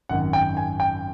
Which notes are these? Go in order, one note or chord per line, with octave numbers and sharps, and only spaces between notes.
G#1 F#2 D#3 F#5
G5
G#5
G5